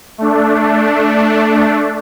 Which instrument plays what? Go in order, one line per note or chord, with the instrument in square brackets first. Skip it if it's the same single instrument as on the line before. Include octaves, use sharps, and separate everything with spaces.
[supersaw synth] A3 D4